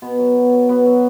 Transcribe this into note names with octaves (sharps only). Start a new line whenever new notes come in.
B2 B3
F#3
B2
F#3
B2 B3
F#3